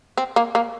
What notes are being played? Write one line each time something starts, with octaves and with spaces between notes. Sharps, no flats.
C4
A#3
A#3